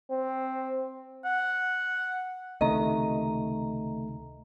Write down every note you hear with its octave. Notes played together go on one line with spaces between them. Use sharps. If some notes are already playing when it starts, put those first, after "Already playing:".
C4
F#5
C#2 C3 D#3 A3 D#5 A#5